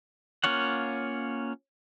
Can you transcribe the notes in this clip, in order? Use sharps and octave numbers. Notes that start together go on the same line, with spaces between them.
A#3 C#4 F4 C#5 F#5